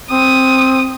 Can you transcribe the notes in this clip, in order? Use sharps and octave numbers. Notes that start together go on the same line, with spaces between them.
C4 D#6